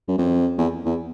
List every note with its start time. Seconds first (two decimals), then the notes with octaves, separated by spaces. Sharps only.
0.08 F#2
0.18 F2
0.58 E2
0.85 E2